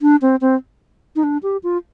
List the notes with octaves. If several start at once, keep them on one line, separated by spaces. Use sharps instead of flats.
D4
C4
C4
D#4
D4
G4
F4